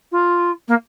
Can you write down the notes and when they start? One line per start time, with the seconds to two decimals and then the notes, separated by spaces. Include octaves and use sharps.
0.12 F4
0.68 A#3